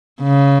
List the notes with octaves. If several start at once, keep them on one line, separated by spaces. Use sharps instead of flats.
C#3